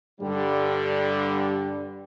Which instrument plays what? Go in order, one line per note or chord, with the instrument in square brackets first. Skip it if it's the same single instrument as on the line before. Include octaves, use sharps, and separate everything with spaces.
[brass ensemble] G2 D3 G3